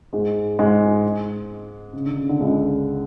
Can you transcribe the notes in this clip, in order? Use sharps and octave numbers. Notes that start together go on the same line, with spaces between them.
G#2 G#3
G#2 G#3
C#3
D3
C#3
D3
C#2 C#3